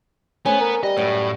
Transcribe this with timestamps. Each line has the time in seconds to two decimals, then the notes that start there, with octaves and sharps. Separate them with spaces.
0.46 A3 B3 C#4 C5 G#5
0.60 A#4
0.83 G3 D#5
0.97 F#2 A2 F#4 B4